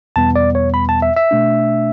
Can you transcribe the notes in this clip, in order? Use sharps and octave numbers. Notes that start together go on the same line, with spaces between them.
E2 B2 G3 B3 A5
D5
C#5
B5
A5
E5
E5
B2 A3 D4